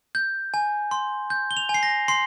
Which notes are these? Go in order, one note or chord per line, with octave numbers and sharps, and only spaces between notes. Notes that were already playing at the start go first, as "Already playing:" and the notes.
G6
G#5
C6
G6
G7
F7
G#5
C7
A#6
C6 C7